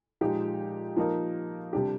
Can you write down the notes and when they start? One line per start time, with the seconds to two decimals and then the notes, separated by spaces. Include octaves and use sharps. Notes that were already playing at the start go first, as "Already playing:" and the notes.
0.21 A#2 F3 G#3 D#4 G4
0.96 F3 A#3 D#4 A#4
1.73 C3 G3 D4 G4